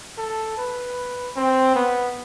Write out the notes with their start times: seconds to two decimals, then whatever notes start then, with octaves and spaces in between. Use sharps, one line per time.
0.18 A4
0.58 B4
1.36 C4
1.75 B3